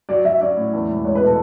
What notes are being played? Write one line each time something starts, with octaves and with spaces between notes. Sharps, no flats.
F#3 D5
F#3 E5
C#4 D5
A2
E2
E1
G#3 C#5
B4
B2
A4